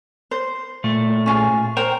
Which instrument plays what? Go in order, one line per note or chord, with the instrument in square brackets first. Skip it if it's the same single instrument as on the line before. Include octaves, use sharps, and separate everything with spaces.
[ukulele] C5
[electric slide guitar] A#2 A3
[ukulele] C#4 F4 G#4
[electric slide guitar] A#4 [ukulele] C5 G5